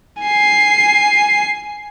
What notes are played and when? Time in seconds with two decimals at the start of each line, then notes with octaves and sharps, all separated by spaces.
0.23 G#5 C7